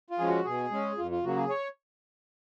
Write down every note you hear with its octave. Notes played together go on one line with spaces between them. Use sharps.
F4
F3 G#3 C#4 G#4
F#4
B2 G#4
G#3 C#4
F2 F4
F4
C#3 F#3 A#3 F#4
G#4
C#5